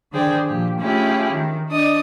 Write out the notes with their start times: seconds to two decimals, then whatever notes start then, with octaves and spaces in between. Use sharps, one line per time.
0.11 D3 D#3 G#4 C5 D5 G5
0.46 A#2 F3 G4
0.79 A3 C#4 E4 F4 G4 G#4
1.31 D#3
1.67 D4 D5 D#5 D#6